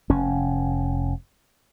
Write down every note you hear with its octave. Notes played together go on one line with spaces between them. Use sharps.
F1 C#4